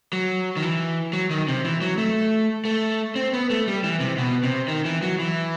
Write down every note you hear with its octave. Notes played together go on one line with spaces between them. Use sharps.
F#3
D#3
E3
F#3
D#3
C3
E3
F#3
A3
A3
C4
B3
A3
G3
E3
C3
B2
C3
D#3
E3
F#3
E3